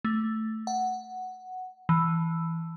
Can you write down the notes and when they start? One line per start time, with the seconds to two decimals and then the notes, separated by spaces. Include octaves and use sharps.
0.05 A3
0.67 F#5
1.89 E3